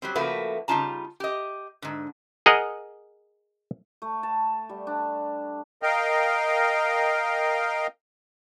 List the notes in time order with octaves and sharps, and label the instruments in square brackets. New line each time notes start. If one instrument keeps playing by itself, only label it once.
[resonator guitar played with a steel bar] F#3 G3 C4
C#3 F3 A3 A#3 F#4 B4
C#3 G3 D#4 F4 A5 A#5
G4 D#5
G#2 D3
[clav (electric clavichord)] G#4 A#4 D#5 F#5
[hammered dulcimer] A3
A5
G3
D4
[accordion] A#4 D#5 F5 G5